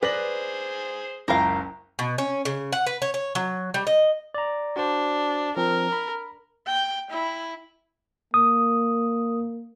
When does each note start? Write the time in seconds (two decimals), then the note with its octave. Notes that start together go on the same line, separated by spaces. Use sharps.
0.03 G#4 B4 C5 D5 A#6 F#7
1.28 F#1 C#2 E4 A#4 F5 G5 A#5
1.99 B2
2.18 C#4
2.45 C#3
2.72 F#5
2.87 B4
3.02 C#5
3.14 C#5
3.35 F#3
3.74 G3
3.87 D#5
4.34 D5 A#5
4.76 D4 F#4 C5
5.57 F3 C4 A#4
5.92 B5
6.66 G5
7.10 E4
8.34 A#3 D#6